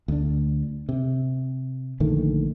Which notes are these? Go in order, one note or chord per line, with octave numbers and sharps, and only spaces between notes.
D2 D4
C3
A#1 D3 D#3 A3